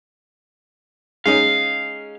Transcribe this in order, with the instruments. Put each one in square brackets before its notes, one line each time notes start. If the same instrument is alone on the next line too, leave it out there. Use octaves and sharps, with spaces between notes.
[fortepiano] G#3 C#4 D#4 [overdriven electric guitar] F5